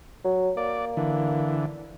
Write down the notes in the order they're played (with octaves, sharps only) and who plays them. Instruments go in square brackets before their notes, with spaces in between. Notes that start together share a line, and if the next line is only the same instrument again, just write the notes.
[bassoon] F#3
[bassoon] A#3 [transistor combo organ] D5
[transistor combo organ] D3 E3